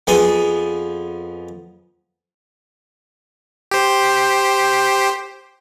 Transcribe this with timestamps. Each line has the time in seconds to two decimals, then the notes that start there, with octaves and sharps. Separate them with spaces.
0.07 F2 F3 B3 G#4 G#5
3.71 G4 C5